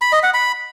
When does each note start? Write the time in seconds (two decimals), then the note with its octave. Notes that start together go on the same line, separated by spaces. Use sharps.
0.01 B5
0.12 D#5
0.23 F#5
0.34 B5